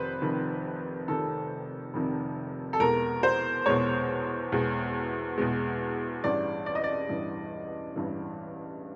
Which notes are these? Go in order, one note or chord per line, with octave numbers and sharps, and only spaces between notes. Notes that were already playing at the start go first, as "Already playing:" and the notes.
Already playing: F1 C3 D#3 B4 C5
F1 F2 C3 D#3
F1 F2 C3 D#3 A4
F1 F2 C3 D#3
A4
E2 B2 G#3 A#4
C5
E2 B2 G#3 C#5
E2 B2 G#3
E2 B2 G#3
A1 G2 E3 D5
D5
D#5
D5
A1 G2 E3
A1 G2 E3